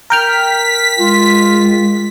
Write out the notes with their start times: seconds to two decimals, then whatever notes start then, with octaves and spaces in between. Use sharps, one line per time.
0.10 A#4 G5 F6 B6
0.99 G#3 F4